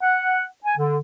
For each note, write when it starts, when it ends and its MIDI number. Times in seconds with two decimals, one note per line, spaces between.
0.02 0.44 78
0.65 0.75 80
0.78 0.98 50